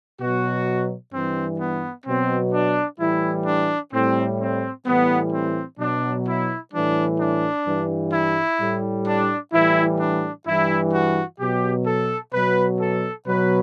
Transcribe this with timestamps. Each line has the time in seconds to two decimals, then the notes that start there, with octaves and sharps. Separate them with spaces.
0.20 B2 F#3 F#4
1.13 G2 E3 G3 C4
1.60 B3
2.06 B2 F#3 C4
2.54 D4
3.00 A2 E3 G3 E4
3.46 D4
3.93 A2 G3 C4
4.40 C4
4.86 A2 E3 G3 B3
5.33 C4
5.79 B2 F#3 D4
6.27 E4
6.73 A2 E3 G3 D4
7.20 D4
7.66 G2 E3 G3
8.13 E4
8.60 A2 G3
9.06 D4
9.53 A2 E3 G3 E4
10.00 D4
10.46 G2 E3 G3 E4
10.93 F#4
11.39 B2 F#3 G4
11.86 A4
12.33 B2 F#3 B4
12.80 A4
13.26 B2 F#3 B4